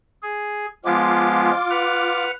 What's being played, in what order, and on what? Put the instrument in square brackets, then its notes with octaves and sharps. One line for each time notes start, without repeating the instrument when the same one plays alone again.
[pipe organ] G#4
[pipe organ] F3 G#3 B3 [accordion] F4 D6
[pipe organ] B4 F#5 F6